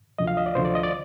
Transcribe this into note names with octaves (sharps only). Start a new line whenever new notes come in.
D2 D3 F3 D#5
F5
D#5
D5
D2 D3 F3 C5
D5
D#5
D5